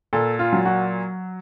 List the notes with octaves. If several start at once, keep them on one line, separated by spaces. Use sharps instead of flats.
A#2 A4
F4
F#3
F#4